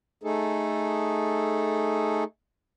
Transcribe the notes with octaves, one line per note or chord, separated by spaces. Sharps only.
A3 D#4 G#4 A4